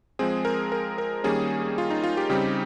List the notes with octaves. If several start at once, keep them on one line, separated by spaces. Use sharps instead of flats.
F3 G#3 C4 G#4
A#4
A#4
A#4
D#3 G3 A#3 C#4 G#4
F4
D#4
F4
G4
C#3 G3 C4 D#4 G4